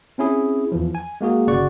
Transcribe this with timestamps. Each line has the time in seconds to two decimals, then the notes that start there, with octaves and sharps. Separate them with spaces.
0.18 C4 C#4 E4 G#4
0.72 E2 E3 F3
0.95 G#5
1.21 G#3 A#3 F#4 G#4
1.47 G1 C#3 F#4 D5 F#5 C#6